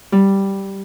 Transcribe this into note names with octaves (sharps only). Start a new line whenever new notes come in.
G3